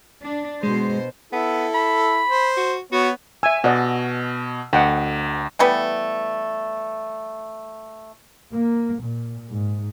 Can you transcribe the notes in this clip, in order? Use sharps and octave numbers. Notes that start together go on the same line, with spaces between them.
D4
B2 G#3 C5
B3 E4 A4
B5
C5
F#4
B3 F#4 C#5
E5 G#5 E6
B2 D5 D#5 F#5
D2 D#5 F#5 G5
E3 G3 A3 B3
A#3
A#2
G#2